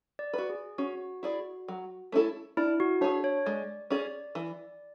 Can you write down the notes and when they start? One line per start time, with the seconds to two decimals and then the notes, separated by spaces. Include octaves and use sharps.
0.19 D5
0.33 F#4 B4
0.49 G#4
0.78 C#4 F#4
1.23 E4 G#4 D5
1.68 F#3
2.12 A3 C#4 E4 A4
2.57 D4 E4
2.80 F#4
3.01 D4 G#4 C#5
3.24 C#5
3.46 G#3 D5
3.90 C#4 G#4 D5
4.35 E3